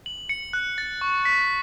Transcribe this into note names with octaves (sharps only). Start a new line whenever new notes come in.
F#7
C#7
F#6
A6
C#6
B6